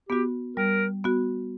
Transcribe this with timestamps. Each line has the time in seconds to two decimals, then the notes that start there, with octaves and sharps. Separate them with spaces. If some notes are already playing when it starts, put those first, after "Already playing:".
0.09 B3 F#4 G4
0.57 G3 A#4
1.04 B3 F#4